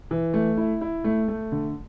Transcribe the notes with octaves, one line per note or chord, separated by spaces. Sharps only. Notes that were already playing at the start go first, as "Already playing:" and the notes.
E3
A3
E4
E4
A3
A3
D3